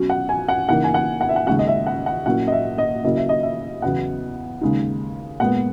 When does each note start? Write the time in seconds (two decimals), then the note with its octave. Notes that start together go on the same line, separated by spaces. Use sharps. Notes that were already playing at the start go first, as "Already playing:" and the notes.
Already playing: B2 F#3 C#4
0.10 F#5
0.29 G#5
0.48 F#5
0.69 C#3 E3 A#3 D#4 F#5
0.84 G#5
0.94 F#5
1.21 F#5
1.29 E5
1.36 F#5
1.47 D#2 C#3 G#3 C#4 F#5
1.59 D#5
1.67 E5
1.87 F#5
2.06 F#5
2.26 A#2 F#3 C#4 E4 F#5
2.47 D#5
2.52 E5
2.78 D#5
3.04 C#3 F#3 A#3 E4 D#5
3.17 E5
3.29 D#5
3.43 E5
3.82 E2 C#3 F#3 B3 F#5
4.61 D#2 C#3 G#3 D#4
5.40 A#2 G#3 B3 F#5